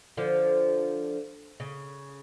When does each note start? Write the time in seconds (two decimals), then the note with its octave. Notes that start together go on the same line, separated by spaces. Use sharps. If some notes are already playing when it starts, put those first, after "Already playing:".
0.17 D3 F3
1.60 C#3